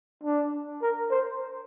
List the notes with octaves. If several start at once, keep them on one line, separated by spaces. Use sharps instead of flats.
D4
A#4
C5